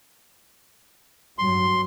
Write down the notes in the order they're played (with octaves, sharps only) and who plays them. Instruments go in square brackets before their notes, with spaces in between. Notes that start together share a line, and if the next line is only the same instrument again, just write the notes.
[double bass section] G2 F#3 [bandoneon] C6